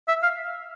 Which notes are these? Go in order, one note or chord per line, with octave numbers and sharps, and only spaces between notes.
E5
F5